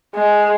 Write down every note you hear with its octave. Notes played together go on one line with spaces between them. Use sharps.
G#3